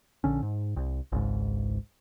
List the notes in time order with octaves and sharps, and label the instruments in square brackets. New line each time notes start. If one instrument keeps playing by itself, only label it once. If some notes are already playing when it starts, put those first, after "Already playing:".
[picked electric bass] A#1 D3 C#4
G#2
C2
G#1 C#2 G#2